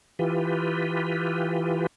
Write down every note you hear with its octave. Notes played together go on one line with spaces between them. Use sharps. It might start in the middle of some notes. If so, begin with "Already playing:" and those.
E3 F4 G4 B4